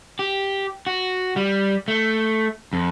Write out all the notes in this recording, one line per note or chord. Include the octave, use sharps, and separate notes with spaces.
G4
F#4
G3
A3
F2